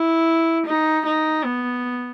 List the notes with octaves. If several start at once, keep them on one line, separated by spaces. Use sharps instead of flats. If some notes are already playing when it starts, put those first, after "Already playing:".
Already playing: E4
D#4
D#4
B3